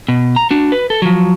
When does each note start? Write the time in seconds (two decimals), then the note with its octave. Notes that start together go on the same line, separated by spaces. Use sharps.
0.08 B2
0.36 A#5
0.51 D4 F#4
0.72 B4
0.90 A4
1.02 F3 F#3